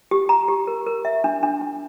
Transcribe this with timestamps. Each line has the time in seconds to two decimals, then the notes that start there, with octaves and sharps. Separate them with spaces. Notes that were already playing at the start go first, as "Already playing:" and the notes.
0.11 G4
0.29 A#5
0.48 G4
0.67 A#4
0.86 A#4
1.05 E5
1.24 D4
1.43 D4
1.61 D4